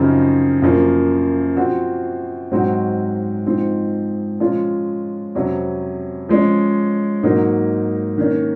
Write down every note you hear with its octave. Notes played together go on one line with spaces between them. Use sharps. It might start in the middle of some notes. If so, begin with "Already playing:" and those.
Already playing: F#2 C#3 F3 C4 D#4
F#2 F3 A#3
F3 C4 F#4
G#2 F#3 C4 D#4 F#4
G#2 F3 C4 D#4
F3 G#3 C#4 F4
F2 C3 F#3 C#4
F3 G#3 C#4
G#2 F#3 A#3 D#4
D#3 A#3 C#4